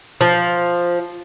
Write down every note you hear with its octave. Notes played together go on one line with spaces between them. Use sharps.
F3